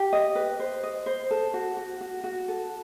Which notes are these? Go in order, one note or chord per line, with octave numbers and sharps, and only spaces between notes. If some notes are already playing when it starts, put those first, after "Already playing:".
Already playing: G4
D#5
B4
C5
D#5
C5
A4
F#4
F#4
F#4
F#4
A4